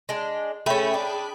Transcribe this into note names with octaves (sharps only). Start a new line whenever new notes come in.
G#3 D4
A3 C#4 G#4 G5 B5
D4